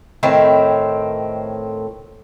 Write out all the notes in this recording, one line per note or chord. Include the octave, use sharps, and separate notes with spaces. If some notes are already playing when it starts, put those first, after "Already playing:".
A2 D#3 C4